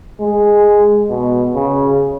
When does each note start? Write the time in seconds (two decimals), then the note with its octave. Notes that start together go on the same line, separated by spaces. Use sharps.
0.21 G#3
1.10 B2
1.55 C#3